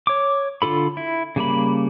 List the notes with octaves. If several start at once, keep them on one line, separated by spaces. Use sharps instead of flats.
C#5 D6
D3 F4 A4 B5
E4
C#3 G3 A#3 B5